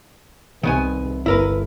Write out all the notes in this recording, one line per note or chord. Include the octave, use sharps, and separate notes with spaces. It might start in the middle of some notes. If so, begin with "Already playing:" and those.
C2 D#3 B3 G#5
G1 E4 A#4 B4